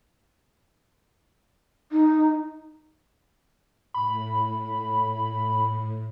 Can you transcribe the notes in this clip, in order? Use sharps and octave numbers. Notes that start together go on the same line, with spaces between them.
D#4
A2 B5